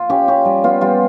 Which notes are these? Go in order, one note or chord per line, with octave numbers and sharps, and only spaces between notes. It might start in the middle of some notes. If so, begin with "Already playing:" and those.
Already playing: F4
C#4 G4
C#4 G4
G3
B3 F4
G3 F4